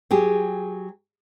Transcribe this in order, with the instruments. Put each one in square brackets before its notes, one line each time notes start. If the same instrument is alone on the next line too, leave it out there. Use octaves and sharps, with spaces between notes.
[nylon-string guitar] F#3 G4 G#4